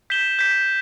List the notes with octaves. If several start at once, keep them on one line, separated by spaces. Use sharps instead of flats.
G6 B6 E7 G7
G6 B6 E7 G7